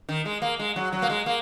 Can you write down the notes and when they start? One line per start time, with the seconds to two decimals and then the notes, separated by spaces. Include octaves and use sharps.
0.09 D#3
0.25 G#3
0.42 A#3
0.59 G#3
0.76 F#3
0.92 F#3
1.02 A#3
1.09 G#3
1.26 A#3